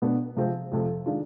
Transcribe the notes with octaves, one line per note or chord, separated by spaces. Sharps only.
B2 B3 D4
C3 F3 G#3 C4
F2 C3 F3
D#3 G#3 D4 F4